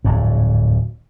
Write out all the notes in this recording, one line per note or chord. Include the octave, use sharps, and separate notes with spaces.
D1 F2 G#2